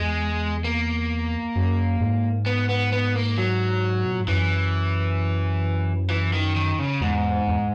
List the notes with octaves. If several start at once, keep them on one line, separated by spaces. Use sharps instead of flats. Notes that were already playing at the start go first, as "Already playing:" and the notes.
Already playing: E2 G#3
A#3
F#2
G#2
B3
B3
B3
A#3
F#3
B2
A#2
G#2
F#2 E3
E3
D#3
D#3
C#3
E2 G#2
E2